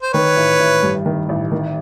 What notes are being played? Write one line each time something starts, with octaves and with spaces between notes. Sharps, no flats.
C5
D#3 B4 C#5
A1
A1
G2
D#3
A1
D#3